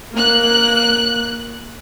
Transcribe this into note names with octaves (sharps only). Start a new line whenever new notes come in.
A#3 F#6